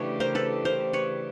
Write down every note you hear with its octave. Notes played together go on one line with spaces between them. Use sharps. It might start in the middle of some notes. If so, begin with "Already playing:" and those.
Already playing: C#3 E3 A3 D4 G4 B4 C#5
A#4 C5
A4 B4
A#4 C5
B4 C#5